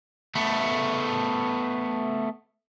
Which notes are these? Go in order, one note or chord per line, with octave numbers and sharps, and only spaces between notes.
A3 B3